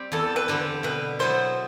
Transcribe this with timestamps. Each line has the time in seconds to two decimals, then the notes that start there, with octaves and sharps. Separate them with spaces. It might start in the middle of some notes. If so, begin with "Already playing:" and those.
Already playing: G3 C4 G4
0.12 E2 A4
0.36 B4
0.48 D3 G3 C4 G4
0.83 B2 B4
1.19 F#3 B3 E4 A4 C5